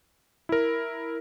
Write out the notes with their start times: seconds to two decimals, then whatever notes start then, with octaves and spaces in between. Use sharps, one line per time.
0.49 E4 A#4